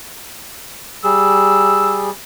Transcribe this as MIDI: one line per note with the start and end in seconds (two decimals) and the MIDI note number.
1.04 2.10 55
1.04 2.10 68
1.04 2.01 88